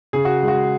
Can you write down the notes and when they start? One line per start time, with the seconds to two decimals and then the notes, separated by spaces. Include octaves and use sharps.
0.13 C#3 G#4
0.25 F#4
0.43 G#3
0.48 F#4